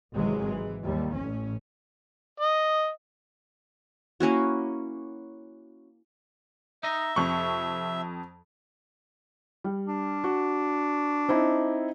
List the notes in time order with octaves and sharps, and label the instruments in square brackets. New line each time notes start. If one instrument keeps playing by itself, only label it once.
[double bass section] G#1 C3 E3 F#3 G#3
E3
D#2 G3
A1 C#4
[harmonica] D#5
[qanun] A#3 C#4 E4 F#4
[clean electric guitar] D#4 D#5 [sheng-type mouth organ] E5
[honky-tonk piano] F2 C#6 [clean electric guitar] C3
[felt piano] G3
[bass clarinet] D4
[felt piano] F#4
C4 D#4 E4